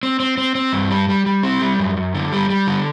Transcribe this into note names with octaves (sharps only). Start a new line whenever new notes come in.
C4
C4
C4
C4
G2
G3
G3
G3
C4
G3
F#2
F#2
D3
G3
G3
D3